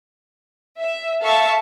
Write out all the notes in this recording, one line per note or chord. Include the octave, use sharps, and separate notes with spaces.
E5
A4 E5 F5 A5 C#6